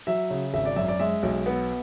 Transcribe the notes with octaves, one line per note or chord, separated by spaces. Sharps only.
F#3 E5
C#3
G#1 E5
D5
F#2 E5
D5
G#3 E5
B1
B3